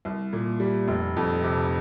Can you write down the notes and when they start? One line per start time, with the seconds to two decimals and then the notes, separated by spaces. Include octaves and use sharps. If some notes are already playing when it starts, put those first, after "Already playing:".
0.05 C2
0.33 A#2
0.60 G3
0.88 F1
1.17 F2
1.44 C3